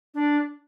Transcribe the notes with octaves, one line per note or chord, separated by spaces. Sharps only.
D4